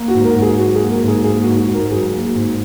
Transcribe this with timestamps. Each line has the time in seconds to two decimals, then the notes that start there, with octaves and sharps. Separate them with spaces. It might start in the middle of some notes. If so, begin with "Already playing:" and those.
Already playing: A#3
0.08 F#4
0.15 G#2
0.25 A#4
0.36 G#2
0.42 G#4
0.58 F#3 F#4
0.75 G#4
0.80 A#3
0.91 A#4
1.03 G#2 G#4
1.24 A#3 G#4
1.42 F#4
1.48 G#2
1.58 F#4
1.68 G#2
1.74 A#4
1.91 F#3 G#4
2.14 A#3
2.35 G#2